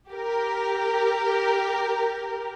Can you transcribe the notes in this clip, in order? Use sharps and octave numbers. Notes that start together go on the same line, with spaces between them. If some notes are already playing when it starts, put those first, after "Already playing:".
G4 A#4